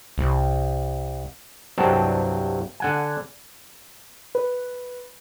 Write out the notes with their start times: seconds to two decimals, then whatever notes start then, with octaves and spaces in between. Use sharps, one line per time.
0.18 C2
1.78 C2 G2 F#3 C4 A5
2.80 D3 F#5 G#5
4.35 B4